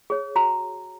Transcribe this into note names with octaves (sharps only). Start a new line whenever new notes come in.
G#4 C#5
F#4 A#5